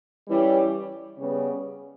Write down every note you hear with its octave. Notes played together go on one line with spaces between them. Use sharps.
E3 G3 C#4 E4
C#3 G3 B3